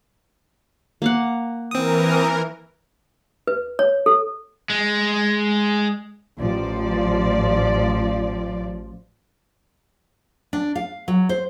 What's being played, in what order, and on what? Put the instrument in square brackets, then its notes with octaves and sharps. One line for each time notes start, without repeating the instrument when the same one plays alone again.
[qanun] A#3 F5 F#5
[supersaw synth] E3 A#4 [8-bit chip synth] C4 D#6
[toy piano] B4
C#5
A4
[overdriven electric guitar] G#3
[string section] A1 F3 D5
[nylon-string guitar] D4
F5
F#3
C5